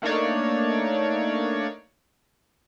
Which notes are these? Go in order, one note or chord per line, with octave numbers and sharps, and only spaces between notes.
A3 A#3 D4 D#4 C#5 D5